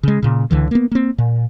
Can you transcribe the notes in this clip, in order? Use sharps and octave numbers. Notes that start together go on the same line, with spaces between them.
C#3 G#3
A#2 C#3
C#2 D3 E3
A#3 B3
A#3 C4
A#2